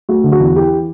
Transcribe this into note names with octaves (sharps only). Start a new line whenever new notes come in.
A3 F#4
D3
F#4
E2
E3 G4